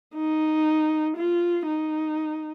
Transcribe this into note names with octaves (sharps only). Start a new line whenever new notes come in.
D#4
F4
D#4